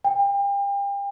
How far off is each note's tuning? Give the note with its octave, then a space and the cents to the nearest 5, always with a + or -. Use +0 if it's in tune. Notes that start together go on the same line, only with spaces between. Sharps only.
G5 +35